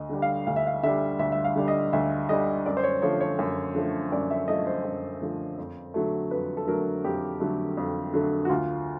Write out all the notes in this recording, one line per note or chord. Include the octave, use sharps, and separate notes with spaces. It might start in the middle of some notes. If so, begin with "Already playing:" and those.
Already playing: D2 D#5
D3 G3
F5
D2 F5
E5
F5
D3 G3 E5
D2 E5
E5
F5
D3 G3
D#5
D2 E5
D3 G3 D#5
F#2 D5
C5
C#5
D3 F3 A3 C#5
C#5
F#2
D3 F3 A3
F#2 D5
E5
D3 F3 A3 D#5
C5
F#2
D3 F3 A3
F2
D3 F#3 A3
F2 B4
A4
D3 F#3 A3 A#4
F2 G4
D3 F#3 A3
F2
D3 F#3 A3
F#4
D2 F4